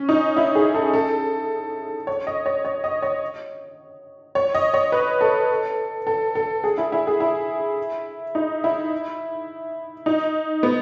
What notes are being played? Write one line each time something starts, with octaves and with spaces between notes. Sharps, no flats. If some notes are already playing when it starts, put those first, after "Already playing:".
Already playing: C#4
D#4
E4
G#4
A4
A4
C#5
D#5
C#5
C#5
D#5
C#5
C#5
D#5
C#5
B4
A4
A4
A4
G#4
E4
E4
G#4
E4
D#4
E4
D#4
B3